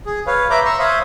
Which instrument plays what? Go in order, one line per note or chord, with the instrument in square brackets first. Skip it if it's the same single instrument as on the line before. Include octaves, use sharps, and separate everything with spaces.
[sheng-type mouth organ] G#4
B4 C#5 F5
B4 E5 A#5 B5 D6 G6
A#5 C6 C#6 E6
C5 C#5 E5 F5 B5 D#6